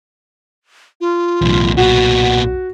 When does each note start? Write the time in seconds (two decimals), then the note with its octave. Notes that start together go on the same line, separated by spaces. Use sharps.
1.01 F4
1.42 B1 E2 A2
1.77 A#2 B3 F#4 F#5